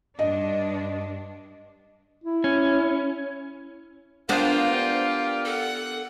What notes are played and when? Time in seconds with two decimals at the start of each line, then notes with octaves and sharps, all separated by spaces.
0.19 G2 D4 D#5
2.24 E4
2.44 C#4
4.29 B3 D4 F4 G4 A#4 C5 D5 F5
5.45 A4 F#5